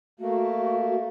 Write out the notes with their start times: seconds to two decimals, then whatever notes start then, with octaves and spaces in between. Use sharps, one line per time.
0.20 A3 A#3 F#4